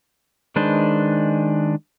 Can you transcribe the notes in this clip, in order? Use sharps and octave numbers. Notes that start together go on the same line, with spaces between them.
D#3 G#3 D4 B4 C5